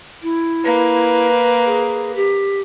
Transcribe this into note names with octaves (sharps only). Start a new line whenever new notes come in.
E4
A#3 B4
G#4
G4